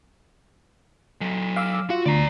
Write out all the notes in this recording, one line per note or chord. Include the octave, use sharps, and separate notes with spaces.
F#3 A4
F5 D6 E6
F4 F#4
D2 D5 A#5